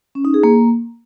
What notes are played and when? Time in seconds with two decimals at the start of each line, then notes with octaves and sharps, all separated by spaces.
0.15 C#4
0.25 D#4
0.34 G#4
0.43 A#3